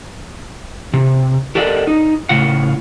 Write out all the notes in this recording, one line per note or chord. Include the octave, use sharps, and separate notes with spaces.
C3
G4 A4 A#4 D5 D#5 F#5
D#4
A2 C#3 F4 F#5